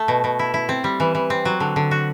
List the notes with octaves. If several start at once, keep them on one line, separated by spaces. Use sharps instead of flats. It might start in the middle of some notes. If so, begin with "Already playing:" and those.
Already playing: A3
B2
B2
E4
E4
C4
G3
E3
E3
C4
F#3
D3
D3
F#4